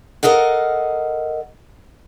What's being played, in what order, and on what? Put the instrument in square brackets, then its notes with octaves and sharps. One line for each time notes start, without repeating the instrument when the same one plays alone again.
[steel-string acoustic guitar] A4 A#4 D#5 F5 F#5